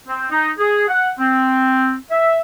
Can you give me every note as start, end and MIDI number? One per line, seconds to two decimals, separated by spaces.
0.08 0.25 60
0.31 0.49 63
0.58 0.84 68
0.88 1.10 78
1.19 1.93 60
2.10 2.39 76